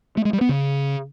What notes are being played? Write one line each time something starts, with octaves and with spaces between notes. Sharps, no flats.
A3
G#3
G3
B3
C#3